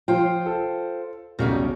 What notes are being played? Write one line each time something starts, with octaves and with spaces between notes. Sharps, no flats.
F3 F4 C5 G5
A4
E1 B1 C#3 G3 D#4 F#4